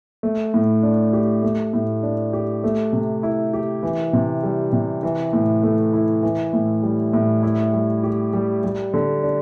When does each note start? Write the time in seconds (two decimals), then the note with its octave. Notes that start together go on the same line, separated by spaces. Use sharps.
0.23 A3
0.54 A2
0.83 D4
1.13 G4
1.43 A3
1.73 A2
2.03 D4
2.33 G4
2.64 A3
2.93 C3
3.23 E4
3.53 G4
3.83 E3
4.13 C3
4.43 G3
4.73 C3
5.03 E3
5.33 A2
5.63 A3
5.93 E4
6.23 E3
6.53 A2
6.83 G3
7.13 A2
7.43 E4
7.73 G3
8.03 G4
8.33 G3
8.64 G3
8.94 D3
9.23 D4